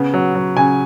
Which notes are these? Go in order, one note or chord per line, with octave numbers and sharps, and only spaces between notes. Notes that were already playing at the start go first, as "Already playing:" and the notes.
Already playing: C#3 B3
F#3
F#3
C#3 G#5